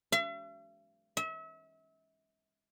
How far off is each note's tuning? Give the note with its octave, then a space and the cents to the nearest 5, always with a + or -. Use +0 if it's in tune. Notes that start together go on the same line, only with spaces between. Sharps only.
E5 +45
E5 -35